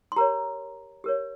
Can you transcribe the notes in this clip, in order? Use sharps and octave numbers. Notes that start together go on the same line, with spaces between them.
C6
G4 A#4 C#5 A#5
G4 A#4 C#5